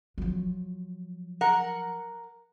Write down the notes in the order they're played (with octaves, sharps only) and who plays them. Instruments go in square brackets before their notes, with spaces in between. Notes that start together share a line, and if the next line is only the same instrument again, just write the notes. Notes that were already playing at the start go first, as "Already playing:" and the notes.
[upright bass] F3 F#3
[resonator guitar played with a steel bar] A#4 F#5